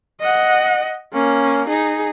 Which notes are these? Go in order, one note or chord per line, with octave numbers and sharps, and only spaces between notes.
D#5 F#5
A#3 C#4
D#4 G#4